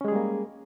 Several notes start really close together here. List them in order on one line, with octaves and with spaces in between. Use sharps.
C#4 G#3 G#4 G3 A#3